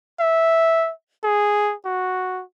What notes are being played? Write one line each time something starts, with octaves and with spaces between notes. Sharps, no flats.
E5
G#4
F#4